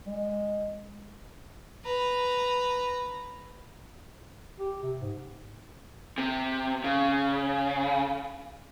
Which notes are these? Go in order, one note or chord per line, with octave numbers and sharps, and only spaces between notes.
G#3
B4 A#5
G4
C3
G#2
C3
C#3